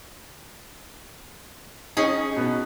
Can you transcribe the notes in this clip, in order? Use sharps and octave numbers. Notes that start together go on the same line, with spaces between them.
C#4 D#4 G#4
B2 B3